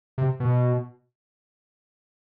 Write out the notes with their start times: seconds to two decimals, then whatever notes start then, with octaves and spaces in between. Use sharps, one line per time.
0.18 C3
0.40 B2